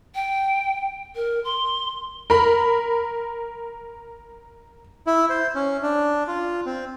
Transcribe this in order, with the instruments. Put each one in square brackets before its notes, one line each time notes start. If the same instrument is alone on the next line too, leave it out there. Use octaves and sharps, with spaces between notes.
[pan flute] G5
A#4
C6
[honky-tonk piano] A#4 B5
[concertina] E4
C5
C#4
D4
F4
C4